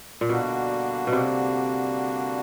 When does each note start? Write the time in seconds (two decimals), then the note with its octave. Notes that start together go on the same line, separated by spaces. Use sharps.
0.21 A#2
0.29 B2 D3 G3 A#3 D4 F#4
1.07 B2
1.12 C3